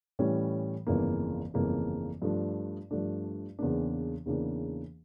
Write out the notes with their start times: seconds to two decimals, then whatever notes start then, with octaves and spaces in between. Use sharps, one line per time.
0.19 A2 E3 G3 C#4
0.86 G1 F2 C#3 E3 A#3
1.54 G1 F2 C#3 E3 A#3
2.22 G2 F3 A3 D4
2.91 G2 F3 A3 D4
3.59 E2 C#3 E3 A#3 D4
4.26 E2 C#3 E3 A#3 D4